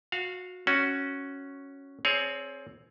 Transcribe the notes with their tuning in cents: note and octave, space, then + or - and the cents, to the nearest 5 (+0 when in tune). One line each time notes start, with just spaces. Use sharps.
F#4 -25 F5 +0
C#4 +0 F#4 +0
C4 +10 G#4 +15 C#5 +30